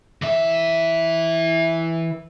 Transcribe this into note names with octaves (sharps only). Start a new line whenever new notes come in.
E3 E5